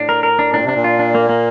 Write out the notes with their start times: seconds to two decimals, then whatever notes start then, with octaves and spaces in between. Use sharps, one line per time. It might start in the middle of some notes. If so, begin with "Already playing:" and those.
Already playing: A2 D4
0.09 A#4
0.23 A#4
0.39 D4
0.54 A#2 D4
0.64 C3 D4
0.75 A#2
0.84 F4
0.99 D4
1.15 A#3
1.29 A#3